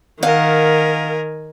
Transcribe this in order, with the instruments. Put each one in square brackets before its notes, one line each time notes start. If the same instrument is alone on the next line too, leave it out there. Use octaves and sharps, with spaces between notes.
[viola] D#3 [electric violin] A#4 G#5 [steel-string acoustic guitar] F5 F#5